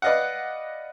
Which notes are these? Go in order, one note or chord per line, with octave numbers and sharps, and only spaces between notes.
B4 D5 D#5 F5 F#5